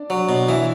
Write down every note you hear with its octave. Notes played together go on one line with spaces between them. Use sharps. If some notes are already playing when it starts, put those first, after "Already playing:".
Already playing: D4 D5
F#3
B2
E3 E4 E5